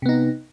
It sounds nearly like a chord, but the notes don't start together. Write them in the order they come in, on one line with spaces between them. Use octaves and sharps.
C3 B3 D#4